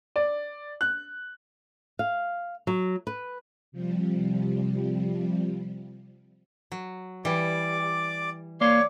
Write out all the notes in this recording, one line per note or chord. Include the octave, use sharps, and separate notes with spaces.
D5
F#6
F5
F#3
B4
C3 F3 G3
F#3
E3 G3 D5 D6
A#3 C#5 D5 F5 C6 C#6